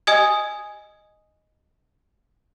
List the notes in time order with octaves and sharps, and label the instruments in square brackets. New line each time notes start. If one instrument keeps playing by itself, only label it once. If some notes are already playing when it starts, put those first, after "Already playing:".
[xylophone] D#5 G#5 D#6 G#6